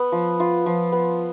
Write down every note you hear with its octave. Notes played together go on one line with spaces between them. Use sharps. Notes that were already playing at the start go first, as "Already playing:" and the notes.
Already playing: B3
F3
F4
F3
B3